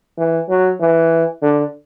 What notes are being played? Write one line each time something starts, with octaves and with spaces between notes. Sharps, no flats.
E3
F#3
E3
D3